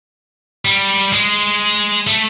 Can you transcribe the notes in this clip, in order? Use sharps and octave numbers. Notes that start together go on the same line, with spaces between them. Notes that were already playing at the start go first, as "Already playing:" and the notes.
G3
G#3
A3